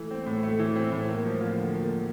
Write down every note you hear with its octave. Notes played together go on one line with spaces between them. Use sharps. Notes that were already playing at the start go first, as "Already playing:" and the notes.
Already playing: E3 A3
C4
A2
A3
E3
C4
A2
A#3
F3
F4
D3
A#3
F3